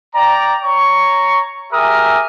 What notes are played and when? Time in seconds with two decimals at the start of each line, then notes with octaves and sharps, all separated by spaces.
0.15 D5 G5 A#5
0.64 C#5 A#5 C#6
1.73 G4 G#4 A#4 E5 D#6